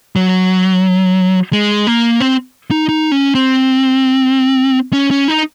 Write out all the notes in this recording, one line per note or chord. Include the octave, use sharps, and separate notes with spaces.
F#3
G#3
A#3
C4
D#4
D#4
C#4
C4
C#4
C#4
D#4